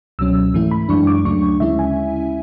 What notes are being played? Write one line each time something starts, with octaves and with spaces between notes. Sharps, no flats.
C#2 B2 F#3 C#4 E6
G#2 E3 A3 E4
B5
F#2 E3 G#3 D4 C#6
D6
D2 C#3 F#3 A3 D4 C#6
D2 C#3 G#3 C#4 E4 E5
G#5